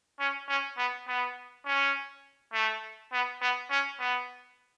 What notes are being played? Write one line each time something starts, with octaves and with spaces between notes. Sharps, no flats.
C#4
C#4
B3
B3
C#4
A3
B3
B3
C#4
B3